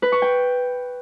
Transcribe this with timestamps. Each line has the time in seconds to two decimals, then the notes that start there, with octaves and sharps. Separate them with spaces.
0.02 B4
0.12 C#6
0.22 G5